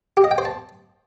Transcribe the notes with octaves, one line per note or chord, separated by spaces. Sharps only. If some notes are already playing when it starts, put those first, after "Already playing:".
G4
D#5
G5
C5
A5